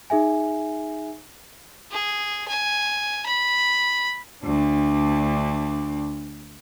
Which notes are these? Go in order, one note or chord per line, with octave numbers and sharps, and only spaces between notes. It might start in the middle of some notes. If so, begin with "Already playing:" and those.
D#4 G#4 E5 G#5
G#4
G#5
B5
D2 D4